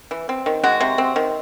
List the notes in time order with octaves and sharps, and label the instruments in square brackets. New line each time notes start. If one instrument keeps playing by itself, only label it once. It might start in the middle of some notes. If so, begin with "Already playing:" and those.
[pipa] E3
C4
D#3
G#3 F#4
C3
C4
D#3